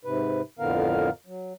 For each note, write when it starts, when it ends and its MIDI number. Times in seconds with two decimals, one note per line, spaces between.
0.05 0.42 44
0.05 0.42 48
0.05 0.42 71
0.59 1.10 41
0.59 1.10 45
0.59 1.10 50
0.59 1.10 59
0.59 1.10 70
0.59 1.10 77
1.27 1.53 54